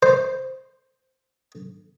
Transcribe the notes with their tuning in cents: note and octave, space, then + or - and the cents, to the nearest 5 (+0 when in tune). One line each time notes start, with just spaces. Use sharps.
C5 +0